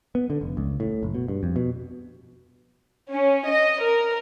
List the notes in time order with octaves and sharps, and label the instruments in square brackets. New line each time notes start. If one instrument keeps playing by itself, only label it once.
[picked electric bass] B3
D3
F1
C#2
A2
F#1
B2
G2
F2
B2
[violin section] C#4
D#5
A#4